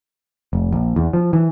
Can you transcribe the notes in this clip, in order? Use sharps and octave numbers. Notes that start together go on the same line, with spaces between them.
F1
A#1
E2
F3
E3